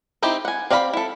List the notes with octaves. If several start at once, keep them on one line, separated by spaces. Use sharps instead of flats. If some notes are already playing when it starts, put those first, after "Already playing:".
C4 D#4 E4 G4
F#5 G#5
C4 D5 F5 A#5 B5
E4 A4